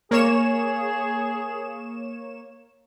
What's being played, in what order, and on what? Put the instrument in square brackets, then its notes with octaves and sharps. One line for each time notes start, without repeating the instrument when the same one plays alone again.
[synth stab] A#3 C#5 E7 [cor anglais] G#4